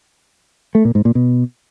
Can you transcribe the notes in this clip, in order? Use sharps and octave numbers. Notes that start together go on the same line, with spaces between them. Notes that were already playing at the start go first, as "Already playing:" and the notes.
A3
A#2
G#2
A#2
B2